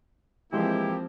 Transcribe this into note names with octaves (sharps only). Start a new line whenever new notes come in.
E3 F3 G#3 A#3 C4 E4 G4